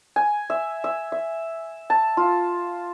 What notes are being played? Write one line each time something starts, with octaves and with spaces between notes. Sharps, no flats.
G#5
E5
E5
E5
A5
F4